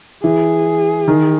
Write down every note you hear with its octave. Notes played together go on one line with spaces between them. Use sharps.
E3 G#4
D#3